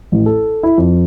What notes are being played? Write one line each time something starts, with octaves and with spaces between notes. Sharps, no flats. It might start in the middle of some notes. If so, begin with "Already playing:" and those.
A1
A4
E4
F2